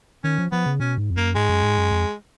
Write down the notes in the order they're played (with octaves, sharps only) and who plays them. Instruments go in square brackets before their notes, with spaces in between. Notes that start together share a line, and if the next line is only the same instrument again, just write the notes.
[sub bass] D#3 [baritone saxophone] C#4
[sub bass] F3
[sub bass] F3 [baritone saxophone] B3
[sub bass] C#3
[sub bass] B2 [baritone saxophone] C#4
[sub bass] G#2
F2
[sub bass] F#2 [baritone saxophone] A#3
[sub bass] G#2 [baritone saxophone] G#3
[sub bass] F#2
G#2
F#2
F2